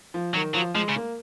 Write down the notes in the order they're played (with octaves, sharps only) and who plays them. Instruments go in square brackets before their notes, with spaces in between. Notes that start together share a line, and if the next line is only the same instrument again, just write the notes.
[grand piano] F3
[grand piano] D#3 [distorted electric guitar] F#3
[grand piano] F3 [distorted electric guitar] F#3
[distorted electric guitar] F3 [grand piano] G#3
[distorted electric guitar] C#3
[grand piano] A#3